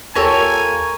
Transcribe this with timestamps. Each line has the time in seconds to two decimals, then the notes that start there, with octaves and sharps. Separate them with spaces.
0.15 D#2 F4 G4 A4 A#4 C#5 G#5